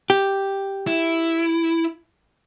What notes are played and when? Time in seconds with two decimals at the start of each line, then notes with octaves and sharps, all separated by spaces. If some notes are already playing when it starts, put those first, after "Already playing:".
0.10 G4
0.87 E4